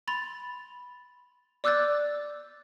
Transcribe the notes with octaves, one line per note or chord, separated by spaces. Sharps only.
B5 C6 A6 F7
D5 D6 E6 F#6 G6 A6